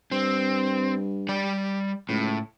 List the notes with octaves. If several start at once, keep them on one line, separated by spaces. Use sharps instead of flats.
G2 C4
G3 D5
C#2 A2